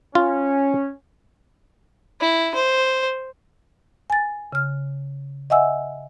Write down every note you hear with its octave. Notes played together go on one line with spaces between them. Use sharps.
C#4 F4
E4
C5
G#5 A6
C#3 F6
D#5 E5 F#5 G#5 E6